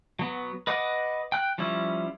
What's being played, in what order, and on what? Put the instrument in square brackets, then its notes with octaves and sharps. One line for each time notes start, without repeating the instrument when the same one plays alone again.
[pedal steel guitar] F#3 B3
B4 D#5 F#5 D6
G5 F#6
F3 G3 C#4 E4